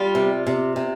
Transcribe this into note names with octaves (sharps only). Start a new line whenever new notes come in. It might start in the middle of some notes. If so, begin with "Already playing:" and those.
Already playing: G3 F4
C3
C3
C3